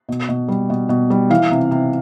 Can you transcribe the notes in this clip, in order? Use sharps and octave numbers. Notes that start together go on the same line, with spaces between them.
B2
B2
G3
B2
B2
G3
E3 F5
C3
C3